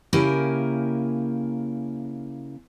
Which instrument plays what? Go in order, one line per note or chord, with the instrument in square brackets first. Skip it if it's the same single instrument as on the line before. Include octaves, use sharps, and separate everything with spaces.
[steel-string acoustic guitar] C#3 A#3 E4 G4 A#4 G#5